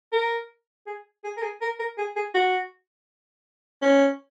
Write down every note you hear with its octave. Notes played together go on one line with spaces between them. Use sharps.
A#4
G#4
G#4
A#4
G#4
A#4
A#4
G#4
G#4
F#4
C#4